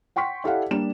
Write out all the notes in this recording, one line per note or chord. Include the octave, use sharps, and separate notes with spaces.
F#5 G5 C6 C#6 B6
E4 G4 A4 D5 F5 F#5
G3 A#3 D4 E7